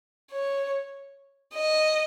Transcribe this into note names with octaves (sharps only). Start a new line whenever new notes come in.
C#5
D#5